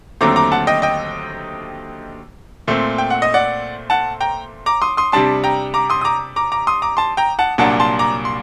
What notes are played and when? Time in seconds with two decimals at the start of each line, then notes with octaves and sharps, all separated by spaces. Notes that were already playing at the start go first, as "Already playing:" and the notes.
0.21 D#2 D3 F#3 A3 C4 A#5 D6
0.36 A#5 D6
0.52 F#5 A5
0.67 D#5 G5
0.82 D#5 G5
2.68 A#2 A3 C4
2.98 G5
3.10 F#5
3.22 D#5
3.34 D5 F#5
3.90 F#5 A5
4.21 G5 A#5
4.66 A#5 D6
4.82 C6 D#6
4.97 C6 D#6
5.12 C3 G3 D4 A5 C6
5.44 G5 A#5
5.74 A#5 D6
5.90 C6 D#6
6.01 D#6
6.05 A#5 D6
6.36 A#5 D6
6.52 A#5 D6
6.67 C6 D#6
6.82 A#5 D6
6.97 A5 C6
7.17 G5 A#5
7.39 F#5 A5
7.58 C2 A#2 F#3 A#3 D4 F#5 A5
7.80 A5 C6
7.99 A#5 D6
8.25 C6